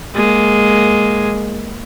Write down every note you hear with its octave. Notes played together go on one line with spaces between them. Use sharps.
G#3 A#3